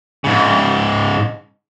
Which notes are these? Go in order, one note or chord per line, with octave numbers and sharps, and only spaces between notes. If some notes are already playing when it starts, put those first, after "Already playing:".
G#2 C#3